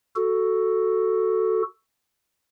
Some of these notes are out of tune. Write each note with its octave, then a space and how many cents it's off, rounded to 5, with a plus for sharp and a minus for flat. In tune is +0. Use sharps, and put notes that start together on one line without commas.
F#4 +5 A4 +0